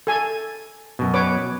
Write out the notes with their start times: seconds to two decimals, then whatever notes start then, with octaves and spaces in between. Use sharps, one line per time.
0.07 A4 G#5
0.99 F#2 B2
1.14 B4 C#5 D6